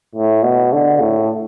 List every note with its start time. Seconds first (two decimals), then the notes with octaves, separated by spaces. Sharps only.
0.15 A2
0.43 B2
0.73 D3
1.01 A2